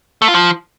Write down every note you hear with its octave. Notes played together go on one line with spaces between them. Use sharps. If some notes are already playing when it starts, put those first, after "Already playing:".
A3
F4
F3